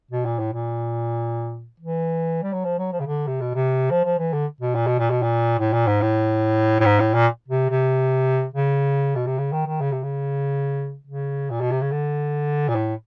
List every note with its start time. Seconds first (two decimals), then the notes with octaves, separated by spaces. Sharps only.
0.11 B2
0.25 A#2
0.39 A2
0.53 A#2
1.80 E3
2.43 G3
2.53 F#3
2.65 F3
2.78 F#3
2.92 F3
3.00 C#3
3.06 D3
3.27 C3
3.41 B2
3.55 C3
3.90 F3
4.05 F3
4.19 E3
4.33 D3
4.61 B2
4.75 A#2
4.87 B2
4.99 A#2
5.10 B2
5.22 A#2
5.59 A2
5.73 A#2
5.87 G#2
6.02 A2
6.80 A2
6.85 G#2
7.00 A2
7.14 A#2
7.48 C3
7.70 C3
8.54 C#3
9.15 B2
9.27 C3
9.38 C#3
9.52 D#3
9.66 D#3
9.81 C#3
9.92 C3
10.03 C#3
11.07 C#3
11.50 A#2
11.61 B2
11.71 C3
11.81 C#3
11.91 D3
12.68 A#2
12.75 A2